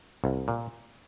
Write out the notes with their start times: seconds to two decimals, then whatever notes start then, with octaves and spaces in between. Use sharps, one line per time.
0.24 C2
0.48 A#2